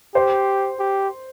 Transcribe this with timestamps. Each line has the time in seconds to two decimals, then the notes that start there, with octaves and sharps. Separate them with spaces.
0.15 G4 C5
0.79 G4